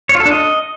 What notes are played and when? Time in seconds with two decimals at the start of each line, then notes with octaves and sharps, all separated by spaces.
0.09 C#5
0.15 F4
0.20 A4
0.26 D4
0.31 D#5